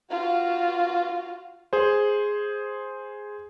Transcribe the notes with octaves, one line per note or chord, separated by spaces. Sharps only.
F4 F#4
G#4 C5